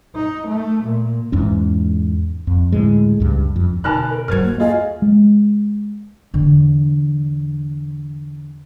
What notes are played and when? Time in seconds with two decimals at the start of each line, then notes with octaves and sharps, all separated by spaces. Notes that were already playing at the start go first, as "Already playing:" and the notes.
0.15 D#4
0.47 A3
0.84 A#2
1.32 E2 G#2 C#4
2.47 F2
2.72 D2 A2 G#3
3.20 C#2 G2
3.56 F2
3.84 B2 D3 D#4 G#5 A5 F6 F#6
4.11 A#4
4.28 G2 F#3 A#4 C5 F6 G#6
4.44 D#2 A#3
4.59 A3 F4 G#4 D#5
5.02 G#3
6.34 E2 D3